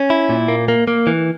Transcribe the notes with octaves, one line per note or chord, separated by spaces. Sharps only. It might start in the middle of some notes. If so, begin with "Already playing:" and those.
Already playing: C#4
E4
A#2
A#3
A#3
A#3
E3